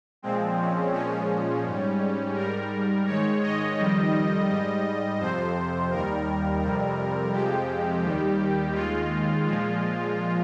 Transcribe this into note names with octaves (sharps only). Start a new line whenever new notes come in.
A#2 F3 G#3 C4
C#4
A#2 F3 G#3 C#4
G#2 G3
G#2 G3 A#4
G#2 D#3 G#3 C#5
D#5
F2 D#3 G3
G#2 G3
F2 C3 F3 C5
D#2 D#3 G3 A#4
F2 C3 G3
F2 C3 F3 G#3 G4
D#2 D#3 G3
D#2 D#3 G#3 F4
A#2 F3 G#3